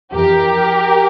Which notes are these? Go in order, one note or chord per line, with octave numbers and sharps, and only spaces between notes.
F2 E3 G4 A#4